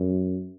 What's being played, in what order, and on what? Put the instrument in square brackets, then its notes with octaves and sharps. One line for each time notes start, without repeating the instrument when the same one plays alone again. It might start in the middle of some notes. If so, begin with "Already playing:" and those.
Already playing: [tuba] F#2